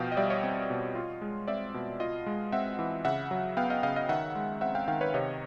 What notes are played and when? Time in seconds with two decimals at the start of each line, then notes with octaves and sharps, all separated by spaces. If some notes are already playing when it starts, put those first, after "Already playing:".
Already playing: B2 F3 F5 G5
0.12 D#5
0.17 G3 D5 E5
0.30 C#5 D#5
0.43 C4
0.70 B2
0.95 F4
1.22 G#3
1.48 C4 D5 E5
1.74 B2
2.00 F4 D#5 F5
2.26 G#3
2.52 C4 E5 F#5
2.79 E3
3.05 C#3 E5 F#5
3.31 F#3
3.57 B3 F5 G5
3.70 D#5 F5
3.83 C#3 D#5 F5
3.96 D#5 F5
4.09 D#3 E5 F#5
4.35 G#3
4.61 C4 E5 F#5
4.75 F5 G5
4.88 D#3 F5 G5
5.01 B4 C#5
5.14 C3 C#5 D#5